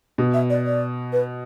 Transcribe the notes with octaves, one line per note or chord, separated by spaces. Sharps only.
B2
E5
D5
D5
B4